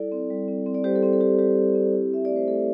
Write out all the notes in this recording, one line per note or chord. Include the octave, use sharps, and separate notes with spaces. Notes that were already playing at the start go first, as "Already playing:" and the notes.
Already playing: G3 E4 A4 D5
C4
G3
C4
C4
D5
G3 G4 C5
A4
C4 G4
A4
G3 G4
G3 G4
G3
C4
E4
E4 E5
A3 D5
C5
A3 A4